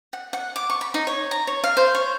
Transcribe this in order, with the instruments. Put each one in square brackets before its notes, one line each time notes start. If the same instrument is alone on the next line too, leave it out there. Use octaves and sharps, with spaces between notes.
[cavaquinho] F#5
F#5
D6
C#6
B5
D#4
C#5
A#5
C#5
F5
C5
C#5